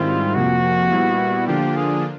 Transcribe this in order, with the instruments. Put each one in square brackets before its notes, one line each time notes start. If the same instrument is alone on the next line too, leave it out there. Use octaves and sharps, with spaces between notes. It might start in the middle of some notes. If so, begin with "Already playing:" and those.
Already playing: [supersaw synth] G#2 D#3 G3 C4 E4 [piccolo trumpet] F4
[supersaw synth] F2 C3 F3 A#3 [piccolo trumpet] F#4
[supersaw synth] A#2 G3 B3 E4
[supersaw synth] D3 F3 A#3 D4 F4 [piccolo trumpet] G4
[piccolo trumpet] G#4